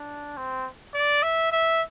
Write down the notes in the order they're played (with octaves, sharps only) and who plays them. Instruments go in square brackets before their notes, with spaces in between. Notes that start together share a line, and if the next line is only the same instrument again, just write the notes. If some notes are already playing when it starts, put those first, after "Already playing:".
Already playing: [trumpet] D4
C4
D5
E5
E5